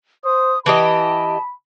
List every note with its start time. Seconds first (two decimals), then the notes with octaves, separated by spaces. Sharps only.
0.25 C5 D#6
0.66 E3 G4 D#5 A5 B5